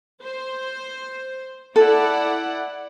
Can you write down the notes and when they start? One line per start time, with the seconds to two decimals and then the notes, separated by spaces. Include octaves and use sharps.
0.23 C5
1.76 E4 A4 D5 F#5